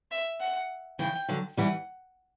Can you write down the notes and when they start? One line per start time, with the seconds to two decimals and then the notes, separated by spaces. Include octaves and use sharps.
0.11 E5
0.40 F#5
0.99 C#3 E3 G5
1.29 D3 F#3
1.57 E3 G3 F#5